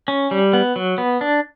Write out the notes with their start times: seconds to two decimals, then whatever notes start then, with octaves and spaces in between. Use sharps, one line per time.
0.08 C#4
0.31 G3
0.53 B3
0.76 F#3
0.98 B3
1.21 D4